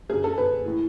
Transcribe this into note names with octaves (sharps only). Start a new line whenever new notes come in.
F#2 D3 G#4
A4
B4
A2 E3